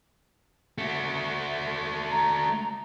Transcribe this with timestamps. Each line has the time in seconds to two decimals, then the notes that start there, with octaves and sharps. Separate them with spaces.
0.78 A3 F#4
2.11 A#5